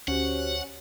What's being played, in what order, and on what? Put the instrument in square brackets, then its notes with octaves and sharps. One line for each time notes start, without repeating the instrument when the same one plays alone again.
[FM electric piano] D2 [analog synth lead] C#4 [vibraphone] F#4 G4 C5 [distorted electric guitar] F#5